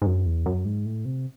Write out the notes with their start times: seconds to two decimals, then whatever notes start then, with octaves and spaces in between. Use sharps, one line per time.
0.02 G#2
0.06 F#2
0.26 E2
0.46 F#2
0.65 G#2
0.86 A2
1.05 C3